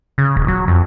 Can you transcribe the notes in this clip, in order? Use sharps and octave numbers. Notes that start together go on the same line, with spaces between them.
C#3
D#1
F#3
F2